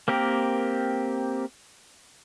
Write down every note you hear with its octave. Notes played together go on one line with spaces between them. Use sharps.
A#3 C4 G4 A#4